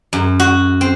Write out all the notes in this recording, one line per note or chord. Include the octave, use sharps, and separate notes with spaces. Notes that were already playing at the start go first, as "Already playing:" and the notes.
F#2
F#4
C4